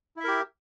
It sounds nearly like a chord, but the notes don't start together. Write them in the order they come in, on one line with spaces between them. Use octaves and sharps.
E4 E5 A#4 G4